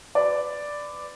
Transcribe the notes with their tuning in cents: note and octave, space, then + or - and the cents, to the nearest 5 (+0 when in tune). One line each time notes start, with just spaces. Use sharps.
B4 +25 D5 +0